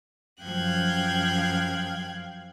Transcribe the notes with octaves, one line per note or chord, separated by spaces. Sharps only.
F#2 F3 F5 G5 F#6 G#6